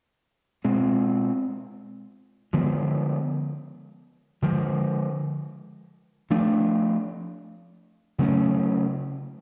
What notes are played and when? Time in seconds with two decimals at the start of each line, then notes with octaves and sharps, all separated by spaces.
0.64 B2 G#3 C4
2.53 D3 F3 G#3 B3
4.42 D3 F3 G#3
6.30 F3 A3 D4
8.18 C#3 F#3 A3 C#4